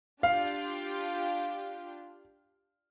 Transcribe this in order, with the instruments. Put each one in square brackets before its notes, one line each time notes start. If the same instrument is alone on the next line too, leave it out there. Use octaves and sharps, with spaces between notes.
[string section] D4 F4 G4 [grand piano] F5